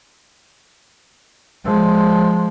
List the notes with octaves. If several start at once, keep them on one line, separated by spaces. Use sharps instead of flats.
F3 G#3